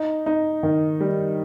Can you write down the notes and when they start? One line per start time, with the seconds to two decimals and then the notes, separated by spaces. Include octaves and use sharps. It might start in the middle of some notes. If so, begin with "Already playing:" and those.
Already playing: D#4
0.26 D#4
0.63 D#3
1.01 G3